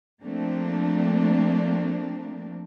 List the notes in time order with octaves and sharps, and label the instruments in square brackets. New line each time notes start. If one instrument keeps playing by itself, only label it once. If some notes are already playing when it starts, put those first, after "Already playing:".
[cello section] F3 A3 A#3 C4 D4